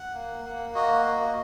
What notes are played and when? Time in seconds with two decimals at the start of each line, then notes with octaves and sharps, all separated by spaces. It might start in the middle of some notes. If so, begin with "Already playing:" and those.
Already playing: F#5
0.14 A#3
0.45 A#3
0.75 F#4 D#5
1.06 A#3